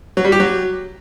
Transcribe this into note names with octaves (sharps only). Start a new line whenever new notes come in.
F#3
G3
G4
F#3